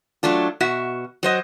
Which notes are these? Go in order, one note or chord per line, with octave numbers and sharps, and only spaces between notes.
F#3 A3 D4 F4
B2 F#4 E5
F#3 C5 D#5